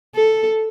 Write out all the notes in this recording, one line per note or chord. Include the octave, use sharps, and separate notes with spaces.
A4